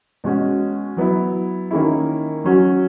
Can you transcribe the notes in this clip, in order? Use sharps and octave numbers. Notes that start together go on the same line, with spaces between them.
B2 G#3 C#4 F#4
F#3 B3 E4
D#3 A#3 C#4 E4
F#3 C#4 F#4